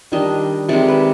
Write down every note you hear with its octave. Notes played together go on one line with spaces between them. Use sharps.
D#3 G3 D4 D#5
C3 D#3 G#3 D5
B4